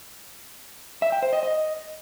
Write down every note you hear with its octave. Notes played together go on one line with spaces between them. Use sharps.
E5
G5
C5
D#5
D#5